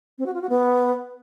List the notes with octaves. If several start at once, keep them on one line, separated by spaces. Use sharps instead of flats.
C4
F#4
F4
F#4
B3